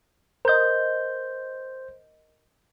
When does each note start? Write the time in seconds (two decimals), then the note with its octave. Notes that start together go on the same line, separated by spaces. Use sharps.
0.45 A#4 C5 D#5 G6